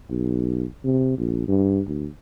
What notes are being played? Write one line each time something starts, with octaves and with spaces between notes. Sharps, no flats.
B1
C3
A#1
G2
D2